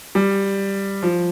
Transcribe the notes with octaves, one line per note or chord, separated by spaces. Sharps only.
G3
F3